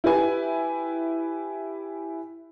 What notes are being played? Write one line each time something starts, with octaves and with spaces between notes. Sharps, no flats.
E4 G4 B4 G#5